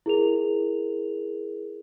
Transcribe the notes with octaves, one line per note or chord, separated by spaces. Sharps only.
E4 G#4 A#4 F7